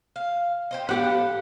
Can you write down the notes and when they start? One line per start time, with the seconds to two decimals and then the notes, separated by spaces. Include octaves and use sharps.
0.16 F5
0.71 G4 C5 D#5
0.89 B3 G4 A4 F5 F#5